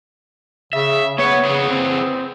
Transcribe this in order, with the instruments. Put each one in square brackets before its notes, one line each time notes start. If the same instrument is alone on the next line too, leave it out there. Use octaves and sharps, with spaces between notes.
[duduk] C#3 [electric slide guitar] E5
[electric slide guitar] B3 B4 F#5 [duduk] C#5
[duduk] C#3 [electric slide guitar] G#4 B4 F#5
[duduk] C4